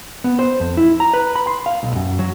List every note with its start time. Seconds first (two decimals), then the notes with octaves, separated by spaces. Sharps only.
0.24 B3
0.39 C5
0.60 F2
0.77 E4
1.00 A#5
1.14 B4
1.36 B5
1.47 C6
1.66 F5
1.83 B1
1.96 F#2
2.19 F#3